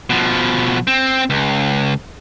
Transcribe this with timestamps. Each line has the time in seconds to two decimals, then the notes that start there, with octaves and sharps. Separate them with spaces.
0.10 B2 F3
0.87 C4
1.30 C#2